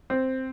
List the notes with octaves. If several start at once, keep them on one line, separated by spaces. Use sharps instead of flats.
C4